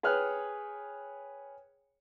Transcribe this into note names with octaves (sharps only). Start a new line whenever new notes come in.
G#4 B4 C#5 G5 F6 F#6